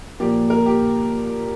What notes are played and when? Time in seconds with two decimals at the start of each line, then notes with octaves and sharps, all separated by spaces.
0.20 A#2 F3 A#3 G4
0.50 A#4
0.66 G4